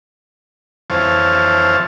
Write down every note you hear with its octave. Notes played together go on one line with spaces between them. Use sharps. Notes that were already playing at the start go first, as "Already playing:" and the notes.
F2 E3 C5 C#5 F5 A5